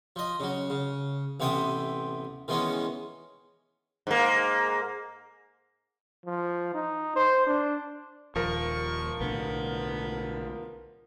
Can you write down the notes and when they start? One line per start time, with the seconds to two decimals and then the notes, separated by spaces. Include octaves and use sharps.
0.16 F3 D#5
0.40 C#3 F#3
0.70 C#3
1.40 A1 C3 B3 E5 G5 D#6
2.48 D#3 E3 G#3 B3 C#4 D#4
4.07 G#2 A#3
6.26 F3
6.74 D#4
7.16 C5
7.46 D4
8.36 D#1 F3 A#3 A#4 C#6
9.20 B1 A2 D3 B3